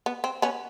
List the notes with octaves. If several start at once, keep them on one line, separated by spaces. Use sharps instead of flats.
B3
C4
B3 C#4